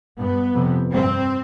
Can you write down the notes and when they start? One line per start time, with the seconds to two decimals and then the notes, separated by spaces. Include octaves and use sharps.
0.19 G2 B3
0.55 F2 C3
0.92 G2 C4